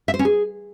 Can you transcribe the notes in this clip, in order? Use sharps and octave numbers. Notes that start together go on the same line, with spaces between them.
E5
C5
C#4
G#4